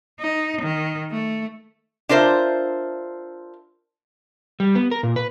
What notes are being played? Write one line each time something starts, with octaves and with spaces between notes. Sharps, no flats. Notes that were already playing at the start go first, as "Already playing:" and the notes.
D#4
D#3
A3
D4 F4 A#4 C5 E5
G3
B3
A#4
A#2
B4